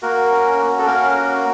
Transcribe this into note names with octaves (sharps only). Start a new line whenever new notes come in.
A#3 F#4 A#4
C#4
F#4
A4
A#3 C#4 A#4
F#4